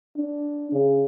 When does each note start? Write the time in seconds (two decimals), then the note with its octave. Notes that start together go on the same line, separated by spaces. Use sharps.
0.17 D4
0.72 C#3